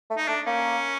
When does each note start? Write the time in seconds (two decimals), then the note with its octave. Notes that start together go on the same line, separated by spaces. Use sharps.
0.10 A3
0.17 D#4
0.28 A3 D4
0.46 A#3 C#4